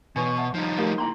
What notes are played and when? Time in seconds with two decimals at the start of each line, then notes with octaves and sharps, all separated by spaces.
0.16 B2 E3 B4 G#5 C#6
0.37 E5 F#5 A5
0.54 F3 G3 D#4
0.78 A3 G4 A#4 F5
0.98 C#2 A#3 E4 A#5 C6